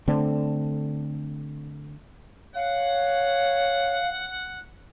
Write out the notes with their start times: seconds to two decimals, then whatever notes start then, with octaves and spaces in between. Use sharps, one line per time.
0.08 D3 A3 C4 D4
2.55 C#5 F5 F#5